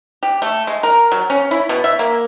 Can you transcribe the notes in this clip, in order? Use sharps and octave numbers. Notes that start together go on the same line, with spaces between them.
G4
A3
G#3
A#4
F#3
C#4
E4
B2
E5
A#3